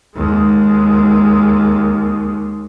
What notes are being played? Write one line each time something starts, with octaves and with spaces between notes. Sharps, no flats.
D#2 G#3